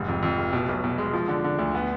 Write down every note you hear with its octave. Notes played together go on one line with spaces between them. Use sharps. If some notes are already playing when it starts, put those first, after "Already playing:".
Already playing: F1 G#2
F2
F2
F1
B2
B1
B2
G#3
F3
D3
D3
D2
B3